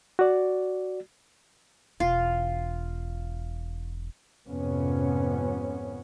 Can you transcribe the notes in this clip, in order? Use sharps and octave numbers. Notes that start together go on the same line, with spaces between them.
F#4 D5
E1 F4
F2 G#2 C3 B3 C#4